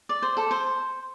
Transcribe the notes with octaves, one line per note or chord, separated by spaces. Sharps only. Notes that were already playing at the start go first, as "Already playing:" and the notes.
D5
C5
A4
C5